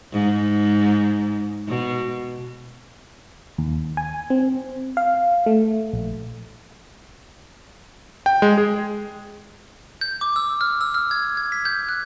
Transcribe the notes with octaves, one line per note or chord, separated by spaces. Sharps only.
G#2
B2
D#2
G#5
C4
F5
A3
A#1
G5
G#3
G#4
G6
D6
E6
F6
E6
F6
G#6
G#6
B6
G6
F#6